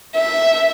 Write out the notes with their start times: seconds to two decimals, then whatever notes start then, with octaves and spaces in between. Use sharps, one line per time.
0.14 E5